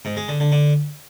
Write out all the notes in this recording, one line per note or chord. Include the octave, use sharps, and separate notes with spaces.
G#2
G#3
D3
D3
D3